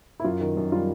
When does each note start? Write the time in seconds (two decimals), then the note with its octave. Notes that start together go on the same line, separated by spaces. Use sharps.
0.20 E4
0.24 F#2 F4
0.40 D#3
0.57 F#2
0.72 G3 F4